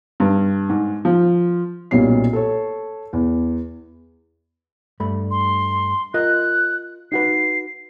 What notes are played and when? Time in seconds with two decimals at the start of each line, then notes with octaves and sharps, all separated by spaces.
0.20 G2
0.69 G#2
1.05 F3
1.91 B1 A#2 G3 C#4 C7
2.33 A4 C#5
3.13 E2
5.00 G2 A3 B5
5.31 C6
6.14 F4 A#4 D#5 F#6
7.12 D#4 F#4 B4 C7